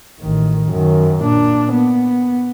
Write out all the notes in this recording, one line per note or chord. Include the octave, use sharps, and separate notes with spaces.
A1 D#3
F#2 D#3
A#2 D4
B3